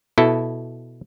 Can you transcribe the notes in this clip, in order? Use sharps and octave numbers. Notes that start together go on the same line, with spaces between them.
B2 E4 A4